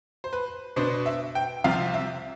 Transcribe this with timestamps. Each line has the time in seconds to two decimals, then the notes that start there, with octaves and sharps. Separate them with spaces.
0.24 C5
0.33 B4
0.76 B2 B3 D4 C5
1.06 E5
1.35 G5
1.64 C2 C3 F3 C4 F5
1.94 E5